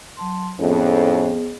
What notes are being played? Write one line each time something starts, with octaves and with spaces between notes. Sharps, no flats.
F#3 A5 C6
F2 A2 B3 C#4 G#4